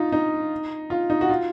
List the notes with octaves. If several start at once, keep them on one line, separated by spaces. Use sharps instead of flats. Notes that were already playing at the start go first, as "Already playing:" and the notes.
Already playing: D#4 F4
D#4
F4
D#4
F#4
F4